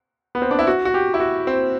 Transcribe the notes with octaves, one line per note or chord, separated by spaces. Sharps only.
B3
C4
D4
E4
F#4
F#4
G4
E4
F#4
C4